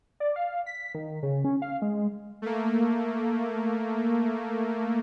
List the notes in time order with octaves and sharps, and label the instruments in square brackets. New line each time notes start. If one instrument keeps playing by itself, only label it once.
[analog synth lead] D5
F5
B6
D#3
C#3
C#4
F5
G#3
[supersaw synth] A3 A#3